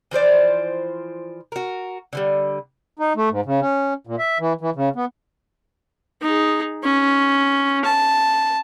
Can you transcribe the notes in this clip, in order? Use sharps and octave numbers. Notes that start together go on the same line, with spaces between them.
E3 F3 C5 D5
F#4 A#4
D3 E3 G3
D#4
A3
G#2
C#3
C#4
A#2
E5
E3
E3
C#3
B3
D#4 G#4
C#4
A5